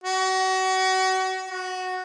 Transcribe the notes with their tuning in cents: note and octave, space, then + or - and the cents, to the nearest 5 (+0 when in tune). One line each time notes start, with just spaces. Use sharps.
F#4 +30
F#4 -5